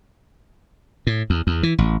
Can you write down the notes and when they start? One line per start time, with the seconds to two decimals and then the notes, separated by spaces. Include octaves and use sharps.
1.07 A2
1.30 E2
1.47 E2
1.63 E3
1.78 A1